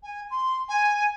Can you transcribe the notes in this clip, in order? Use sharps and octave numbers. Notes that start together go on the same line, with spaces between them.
G#5
C6
G#5